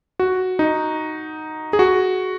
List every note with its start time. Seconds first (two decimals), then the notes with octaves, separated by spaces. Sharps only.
0.19 F#4
0.59 D#4
1.73 G#4
1.79 F#4